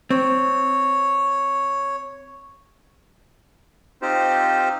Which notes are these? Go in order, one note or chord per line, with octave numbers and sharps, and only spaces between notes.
C4 C#5
C4 D#4 F4 G4 C5